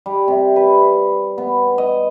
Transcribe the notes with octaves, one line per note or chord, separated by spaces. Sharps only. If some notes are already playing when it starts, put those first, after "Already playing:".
G3
C3
B4
B3
D#5